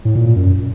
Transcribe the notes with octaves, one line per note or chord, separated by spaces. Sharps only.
A2
A#2
A#2
F#2